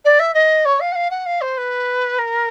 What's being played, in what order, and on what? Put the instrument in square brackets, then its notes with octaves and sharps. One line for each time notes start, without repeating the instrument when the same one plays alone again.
[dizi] D5
E5
D#5
C#5
F5
F#5
F5
F#5
F5
C5
B4
A#4